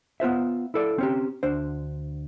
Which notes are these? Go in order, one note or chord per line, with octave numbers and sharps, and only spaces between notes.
B3 F4 C5 E5
E4 A4 D5
C4 C#4 G4
D2 D4 C5